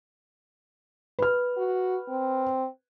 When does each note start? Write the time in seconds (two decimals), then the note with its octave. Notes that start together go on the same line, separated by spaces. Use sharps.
1.19 B4 F6
1.57 F#4
2.09 C4